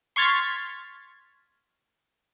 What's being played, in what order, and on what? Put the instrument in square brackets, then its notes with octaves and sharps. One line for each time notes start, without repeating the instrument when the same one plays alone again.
[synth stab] C6 C#6 F6 G#6 A6 B6